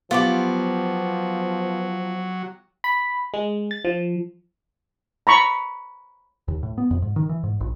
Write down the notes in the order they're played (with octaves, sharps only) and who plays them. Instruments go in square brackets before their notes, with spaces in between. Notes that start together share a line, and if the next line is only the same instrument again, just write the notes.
[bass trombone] F3 [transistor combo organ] F#3 [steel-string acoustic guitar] B3 [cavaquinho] F4 G4 D6
[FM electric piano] B5
G#3
A6
F3
[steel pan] A#5 B5 C#6
[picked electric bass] D#2
A2
B3
F2
G#2
D#3
E3
G#2
A#1